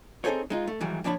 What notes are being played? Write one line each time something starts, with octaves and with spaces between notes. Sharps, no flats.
C4 D#4 G#4 A4 C5 C#5
G#3 D#4 F4
A3
G#2 D#3 E3 F#3 G3
A#2 F3 D4 C#5 A5 B5